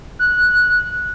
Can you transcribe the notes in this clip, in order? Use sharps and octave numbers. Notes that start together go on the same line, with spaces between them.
F#6